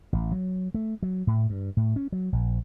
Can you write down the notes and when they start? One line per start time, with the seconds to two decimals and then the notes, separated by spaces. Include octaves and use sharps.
0.13 A1
0.32 F#3
0.74 A3
1.03 F#3
1.27 A2
1.50 G2
1.77 A2
1.96 C#4
2.12 F#3
2.33 A#1